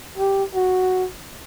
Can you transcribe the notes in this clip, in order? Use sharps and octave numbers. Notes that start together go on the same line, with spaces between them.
G4
F#4